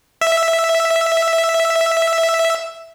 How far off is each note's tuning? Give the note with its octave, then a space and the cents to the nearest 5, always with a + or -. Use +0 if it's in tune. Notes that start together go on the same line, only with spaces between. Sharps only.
E5 +0